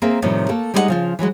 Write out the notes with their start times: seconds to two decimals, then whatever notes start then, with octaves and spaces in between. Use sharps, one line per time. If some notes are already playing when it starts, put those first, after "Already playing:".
0.02 A#3 C4 G#4 A#4 E5
0.22 A2 C3 D#3 F3 G3
0.49 A3 A#3 A4
0.74 G3 G#3 D#4 E4 D#5 F#5
0.88 C#3 F3 F4
1.19 E3 F#3 G#3 F#4